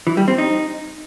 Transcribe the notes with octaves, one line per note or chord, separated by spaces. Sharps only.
E3
G3
C4
D#4